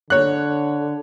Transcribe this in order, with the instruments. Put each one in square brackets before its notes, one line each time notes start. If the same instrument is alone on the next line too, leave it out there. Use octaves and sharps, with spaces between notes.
[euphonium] D3 [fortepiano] C#5 F#6